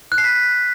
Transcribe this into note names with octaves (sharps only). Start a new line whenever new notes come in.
F#6
C7
B6